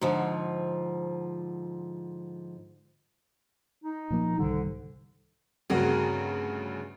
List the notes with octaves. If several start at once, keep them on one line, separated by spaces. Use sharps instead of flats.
G#2 D3 F3
D#4
A#2 F3 A#3
C2 G#2 D3 D#3 G3
D2 G2 C#3 C4 F#4 G#4 A#4